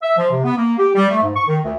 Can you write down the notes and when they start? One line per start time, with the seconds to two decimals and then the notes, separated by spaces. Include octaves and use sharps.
0.02 E5
0.17 F3
0.31 C3
0.44 B3
0.57 A#3
0.78 G4
0.95 G3
1.09 A3
1.22 G#2
1.35 C#6
1.47 D#3
1.63 D2